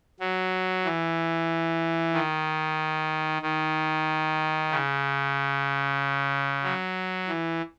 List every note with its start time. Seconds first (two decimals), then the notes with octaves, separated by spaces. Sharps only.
0.20 F#3
0.85 E3
2.13 D#3
3.42 D#3
4.71 C#3
6.63 F#3
7.28 E3